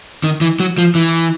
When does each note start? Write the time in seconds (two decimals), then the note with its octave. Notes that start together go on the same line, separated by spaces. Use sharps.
0.24 D#3
0.41 E3
0.60 F#3
0.78 F3
0.95 E3